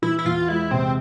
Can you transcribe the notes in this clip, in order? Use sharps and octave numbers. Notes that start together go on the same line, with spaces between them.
E3 E4
E4
E2 F4
G#3 E4
C3 C4